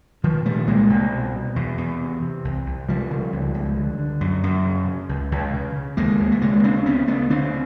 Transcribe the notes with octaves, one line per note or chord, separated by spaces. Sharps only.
A#2 D#3 F3
A#2 G3 A3
C2 G#3 A#3
C2
B2
B2
E2
E2
C3
C3
C2
C2
C#3 F3 G3
C#3
C#2
C#2
D3
D3
F#2
F#2
C#3
C#3
C#2
C#2
C#3
C#3
D#2 G#3 A#3
D#2
A3
C#3 G#3 A#3
C#3 C4 D4
D2 B3 C#4
D2 A3 B3
D3 C4 D4